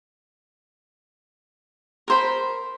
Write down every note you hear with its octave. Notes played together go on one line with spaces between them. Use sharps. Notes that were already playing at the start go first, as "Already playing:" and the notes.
A#4 C5 B5